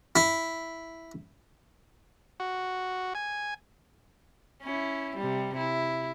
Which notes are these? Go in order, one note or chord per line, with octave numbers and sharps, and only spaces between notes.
E4
F#4
G#5
C#4 E4
C3 G3
E4